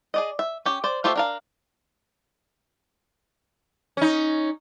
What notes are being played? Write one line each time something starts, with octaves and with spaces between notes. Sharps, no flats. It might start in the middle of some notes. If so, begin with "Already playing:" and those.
G#4 D5 D#5
E5
C#4 G4
C5 D5
A3 F4 G4 C5 E5
D4 A#4 F5
C#4 D#4